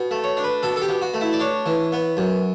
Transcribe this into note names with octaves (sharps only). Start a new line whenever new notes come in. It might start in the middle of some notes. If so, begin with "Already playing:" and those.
Already playing: B2
A3
C#5
D4
B4
B2 A4
A4
G4
B2
F#4
A3
E4
D5
D4 C#5
E3
B3
F#2